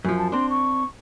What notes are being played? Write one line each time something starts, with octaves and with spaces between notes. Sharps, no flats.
F#2 F3
A5
C4 D4 C6
C#6